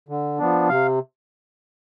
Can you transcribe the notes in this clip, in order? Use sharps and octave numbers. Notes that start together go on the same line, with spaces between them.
D3
F3 B3 D4
C3 F5